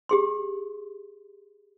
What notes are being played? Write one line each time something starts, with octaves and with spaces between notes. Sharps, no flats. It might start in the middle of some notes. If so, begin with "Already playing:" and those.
G4 G#4 C6